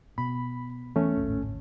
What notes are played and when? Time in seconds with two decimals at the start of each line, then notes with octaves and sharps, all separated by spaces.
0.18 B2 B5
0.96 E3 A3 B3 C#4
1.17 D1 G#1